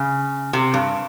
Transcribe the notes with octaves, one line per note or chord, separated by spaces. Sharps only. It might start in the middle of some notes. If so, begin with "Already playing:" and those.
Already playing: C#3
C3
G2